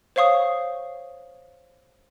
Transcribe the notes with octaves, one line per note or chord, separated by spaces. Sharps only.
C5 C#5 F5 C#6 D#6